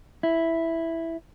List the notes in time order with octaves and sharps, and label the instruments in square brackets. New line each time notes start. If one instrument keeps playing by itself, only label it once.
[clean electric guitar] E4